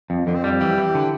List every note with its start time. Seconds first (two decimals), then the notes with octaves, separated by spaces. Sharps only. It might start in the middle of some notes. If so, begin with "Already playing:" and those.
0.10 F2
0.26 F2 D3
0.35 C4
0.44 G3 D4
0.60 E3 G4
0.78 E3
0.95 D3